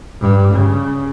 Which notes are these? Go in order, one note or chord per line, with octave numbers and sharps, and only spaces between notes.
G2
C#3